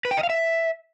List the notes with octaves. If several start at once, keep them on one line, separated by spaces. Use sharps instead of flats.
B4
G5
D#5
F5
E5